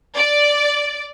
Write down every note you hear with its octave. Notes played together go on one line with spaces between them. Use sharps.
D5